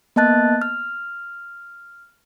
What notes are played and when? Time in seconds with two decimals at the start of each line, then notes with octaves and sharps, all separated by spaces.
0.16 A#3 B3 D#5 A5 F#6 A6
0.61 F6